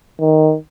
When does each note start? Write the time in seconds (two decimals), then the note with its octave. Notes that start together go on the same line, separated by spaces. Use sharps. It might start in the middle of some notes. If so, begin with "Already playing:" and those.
0.20 D#3